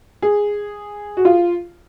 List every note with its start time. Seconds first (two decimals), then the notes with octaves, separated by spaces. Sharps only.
0.22 G#4
1.17 F#4
1.25 F4